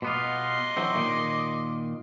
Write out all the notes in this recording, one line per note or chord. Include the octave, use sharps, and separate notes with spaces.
B2 B3 F4 D#5 C6 D6
E3 F#3 C4
A#2 D#3